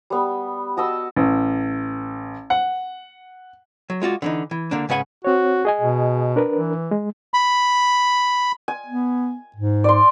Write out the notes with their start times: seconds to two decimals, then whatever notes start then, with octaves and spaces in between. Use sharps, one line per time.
0.10 G3 B3
0.77 F#4 D#5 A5 E6
1.16 A1
2.50 F#5
3.90 F#3
4.02 G#3 F4 F#4 D5
4.22 D3 E3 D#4
4.51 E3
4.71 D3 A#3 D4
4.89 G#2 C#3 B4 F#5 G#5
5.24 C4 F#4 C#5
5.65 G#4 D#5 G#5
5.81 B2
6.36 D4 A#4 B4
6.54 E3
6.91 G#3
7.34 B5
8.68 G#5
8.86 B3
9.56 G#2
9.84 D5 C6